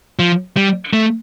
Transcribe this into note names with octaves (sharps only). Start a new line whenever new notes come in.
F3
G3
A3